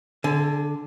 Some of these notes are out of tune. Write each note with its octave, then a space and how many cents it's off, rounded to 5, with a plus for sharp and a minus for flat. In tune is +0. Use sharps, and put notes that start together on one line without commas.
D3 +0 G#4 +40